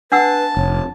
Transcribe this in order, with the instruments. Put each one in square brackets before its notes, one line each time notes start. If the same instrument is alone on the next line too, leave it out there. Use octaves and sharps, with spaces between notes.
[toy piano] D4 F#5 E6 [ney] B4 [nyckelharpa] A5
[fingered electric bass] F1 [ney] C#5